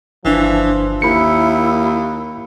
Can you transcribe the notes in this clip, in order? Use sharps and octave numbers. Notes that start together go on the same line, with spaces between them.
G1 E3 F3 D4
D#2 A#3 E4 B5 C#7